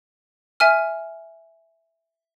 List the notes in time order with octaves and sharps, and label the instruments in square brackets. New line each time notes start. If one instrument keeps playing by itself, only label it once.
[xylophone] E5 G#5 F6